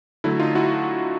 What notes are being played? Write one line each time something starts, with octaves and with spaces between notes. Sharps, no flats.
D3 F#3 A3 E4
D#4 F4
E4 F#4